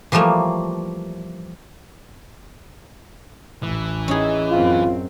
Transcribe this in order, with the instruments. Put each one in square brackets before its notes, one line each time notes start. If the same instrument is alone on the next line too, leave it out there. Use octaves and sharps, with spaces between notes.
[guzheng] E3 F3 G3 A3 A#3
[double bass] A1 [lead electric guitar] E3
[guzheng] C#4 D#4 G#4
[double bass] F#2 C4 [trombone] F4